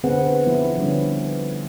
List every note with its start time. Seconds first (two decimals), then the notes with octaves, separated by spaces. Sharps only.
0.04 D3 B3 C4 G#4 B4 F#5
0.47 F3 B3 E4
0.77 D3 G3 C#4